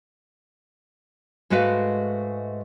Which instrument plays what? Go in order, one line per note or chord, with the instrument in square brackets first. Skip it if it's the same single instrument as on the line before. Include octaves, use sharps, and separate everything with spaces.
[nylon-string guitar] G#2 G#3 A3 F#4 B4 F5